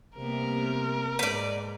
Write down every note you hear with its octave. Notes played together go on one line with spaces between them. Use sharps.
C3 G3 A#3 B3 A#4
G#2 B4 D5